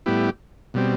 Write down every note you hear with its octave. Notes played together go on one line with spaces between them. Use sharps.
A2 G3 B3 E4 G4
B2 G3 C4